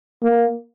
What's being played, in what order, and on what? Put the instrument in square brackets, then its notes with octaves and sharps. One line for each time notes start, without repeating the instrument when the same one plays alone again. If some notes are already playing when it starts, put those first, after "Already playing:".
[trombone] A#3